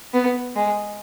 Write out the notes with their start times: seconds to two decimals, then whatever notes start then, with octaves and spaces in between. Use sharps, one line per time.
0.14 B3
0.55 G#3